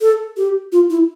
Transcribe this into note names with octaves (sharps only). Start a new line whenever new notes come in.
A4
G4
F4
E4